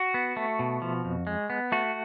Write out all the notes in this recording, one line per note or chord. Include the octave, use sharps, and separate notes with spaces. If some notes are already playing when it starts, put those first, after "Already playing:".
Already playing: F#4
B3
A3
B2
F3
F2
G#3
B3
A3 F#4